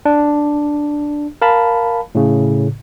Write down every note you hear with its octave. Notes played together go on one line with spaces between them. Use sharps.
D4
A#4 F5 A5 B5
A2 C#3